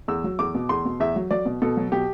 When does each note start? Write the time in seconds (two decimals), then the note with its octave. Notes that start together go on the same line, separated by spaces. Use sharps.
0.08 E2 E6
0.24 F#3
0.39 E2 D6
0.55 B2
0.69 E2 C6
0.85 B2
1.00 E2 E5
1.16 F#3
1.31 F#3 D5
1.46 B2
1.62 B2 A4
1.77 F#3
1.92 B2 G4